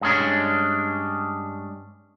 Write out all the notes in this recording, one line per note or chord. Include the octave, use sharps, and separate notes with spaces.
G2 G#3 C#4 D4